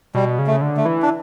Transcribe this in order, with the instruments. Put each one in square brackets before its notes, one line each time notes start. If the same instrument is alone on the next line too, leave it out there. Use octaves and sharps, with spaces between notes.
[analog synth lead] B2 [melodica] G3
[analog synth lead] C#3
[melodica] A3
[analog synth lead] D3
[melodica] A3
[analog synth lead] E3
[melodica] D4